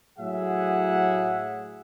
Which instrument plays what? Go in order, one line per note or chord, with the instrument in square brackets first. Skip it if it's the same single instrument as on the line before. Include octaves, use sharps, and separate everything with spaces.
[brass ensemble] A2 F#3 G#4 E5 F#5